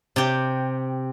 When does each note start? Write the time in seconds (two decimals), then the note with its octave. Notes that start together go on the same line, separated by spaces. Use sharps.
0.16 C3 G4 G5